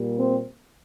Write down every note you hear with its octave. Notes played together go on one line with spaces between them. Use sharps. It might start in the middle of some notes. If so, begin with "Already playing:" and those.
Already playing: A#2 G3 A#3
C4